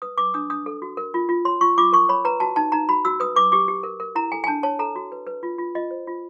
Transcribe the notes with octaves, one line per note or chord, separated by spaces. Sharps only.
B4 D#6
B4 D6
D4 D#6
D4 D#6
A4
F#4
A#4
F4
F4
C#5 C6
F4 C#6
F4 D6
A#4 C#6
C#5 B5
B4 A#5
F#4 A5
D#4 A5
D#4 A#5
F#4 B5
F#4 E6
B4 D#6
B4 D6
G4 D6
G4
A#4
A#4
E4 A#5
A4 G#5
G#5
D4 A5
C#5 A5
A4 A#5
F#4
B4
B4
F4
F4
F4 D#5
C5
F4